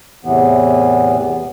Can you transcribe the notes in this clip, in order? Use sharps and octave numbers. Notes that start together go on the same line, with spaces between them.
E2 A2 C3 E3 B3